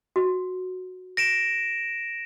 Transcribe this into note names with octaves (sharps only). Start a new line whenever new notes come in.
F#4
A#6 D7 E7